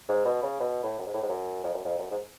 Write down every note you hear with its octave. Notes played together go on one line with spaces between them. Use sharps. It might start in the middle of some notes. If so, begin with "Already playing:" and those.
G#2
B2
C#3
B2
A2
F#2
G#2
A2
G#2
F#2
F2
F#2
F2
F#2
G#2